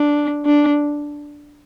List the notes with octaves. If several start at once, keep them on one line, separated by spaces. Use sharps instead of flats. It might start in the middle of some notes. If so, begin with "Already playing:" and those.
Already playing: D4
D4